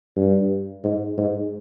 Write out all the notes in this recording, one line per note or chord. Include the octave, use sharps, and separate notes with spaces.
G2
G#2
G#2